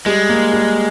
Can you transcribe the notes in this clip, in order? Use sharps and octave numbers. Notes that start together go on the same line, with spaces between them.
G3 G#3
A#3
G3